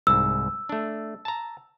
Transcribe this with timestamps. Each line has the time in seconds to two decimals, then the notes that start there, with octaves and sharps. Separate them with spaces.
0.07 C2 G#2 E6
0.69 A3 D4
1.25 A5 A#5